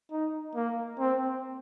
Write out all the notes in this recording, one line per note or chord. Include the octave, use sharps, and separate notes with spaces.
D#4
A#3
C4